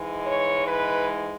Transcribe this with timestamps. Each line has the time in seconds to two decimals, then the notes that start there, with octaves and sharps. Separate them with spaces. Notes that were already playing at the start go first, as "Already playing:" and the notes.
Already playing: G#2 E3 G#3
0.26 C#5
0.68 B4